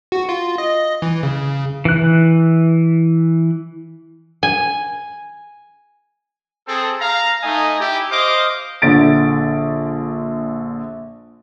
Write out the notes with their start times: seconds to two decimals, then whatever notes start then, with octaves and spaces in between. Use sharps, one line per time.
0.12 F#4
0.29 F4
0.58 D#5
1.02 E3
1.23 C#3
1.85 E3 F#6
4.43 G#5
6.67 C4 G#4 A4
7.00 F5 A#5
7.44 A3 D#4 D#5 G#5
7.80 E4 G4
8.11 C5 D#5 F5 D6
8.82 A#1 D3 A6 D7